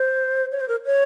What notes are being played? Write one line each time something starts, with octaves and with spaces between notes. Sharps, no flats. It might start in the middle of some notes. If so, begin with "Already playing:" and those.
Already playing: C5
C#5
C5
A#4
C#5